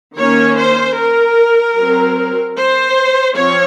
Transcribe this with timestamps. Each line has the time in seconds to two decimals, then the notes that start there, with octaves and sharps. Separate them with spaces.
0.17 D#3 A#3 C#4 C#5
0.57 C5
0.97 A#4
1.76 F#3 C4
2.56 C5
3.36 F3 C4 C#5